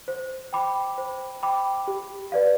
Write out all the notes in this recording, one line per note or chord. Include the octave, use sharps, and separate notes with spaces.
C5
G5 B5 D6
C5
G5 B5 D6
G4
B4 D5 F5